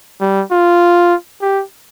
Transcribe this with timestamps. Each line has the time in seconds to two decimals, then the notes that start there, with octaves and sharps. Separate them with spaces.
0.21 G3
0.51 F4
1.42 G4